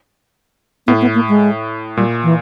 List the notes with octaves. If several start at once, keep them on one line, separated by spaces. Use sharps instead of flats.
A2 B3
B3
A#3
G#3
A#2 G3
E3